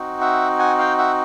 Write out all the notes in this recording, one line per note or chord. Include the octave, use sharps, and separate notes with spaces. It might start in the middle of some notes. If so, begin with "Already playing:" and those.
Already playing: C4 D#4 F#4
E5 F#5
F#5 G#5
F5 G5
E5 F#5